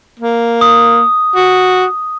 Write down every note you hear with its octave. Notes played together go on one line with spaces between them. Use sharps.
A#3
D#6
F#4